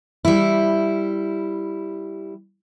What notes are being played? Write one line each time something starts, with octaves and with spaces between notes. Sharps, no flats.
G3 E4